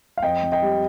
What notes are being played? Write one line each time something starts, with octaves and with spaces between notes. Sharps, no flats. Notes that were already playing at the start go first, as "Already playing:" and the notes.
F5
F2 D#5 G5
F2
D#5 G5
G3